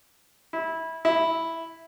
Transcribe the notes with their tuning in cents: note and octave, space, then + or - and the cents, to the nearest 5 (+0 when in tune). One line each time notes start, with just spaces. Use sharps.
E4 -20
E4 -5